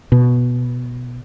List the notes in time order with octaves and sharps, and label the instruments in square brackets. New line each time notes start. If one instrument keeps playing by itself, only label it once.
[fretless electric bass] B2